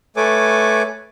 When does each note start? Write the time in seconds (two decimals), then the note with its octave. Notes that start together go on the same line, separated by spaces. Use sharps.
0.16 A3 A4 B4 C#5 G#5 D6